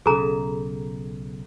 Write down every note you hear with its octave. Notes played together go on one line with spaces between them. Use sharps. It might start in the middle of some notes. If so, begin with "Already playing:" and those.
B1 C#3 G#4 A4 A#5